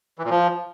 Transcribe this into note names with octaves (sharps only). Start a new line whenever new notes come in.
E3
A#2
F3